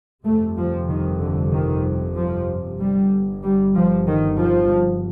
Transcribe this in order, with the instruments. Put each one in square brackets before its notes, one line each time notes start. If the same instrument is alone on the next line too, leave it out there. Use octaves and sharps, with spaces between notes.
[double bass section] G1 F2 C3 A3
F3
D#3
D3
D#3
F3
G1 G2 G3
G3
F3
D#3
F3